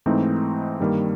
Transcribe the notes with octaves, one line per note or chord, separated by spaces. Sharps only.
G#2 E3 A3 C4 D#4
G2 D#3 G3 A#3